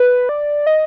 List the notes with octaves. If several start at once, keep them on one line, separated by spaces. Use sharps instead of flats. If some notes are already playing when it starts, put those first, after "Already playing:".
Already playing: B4
D5
D#5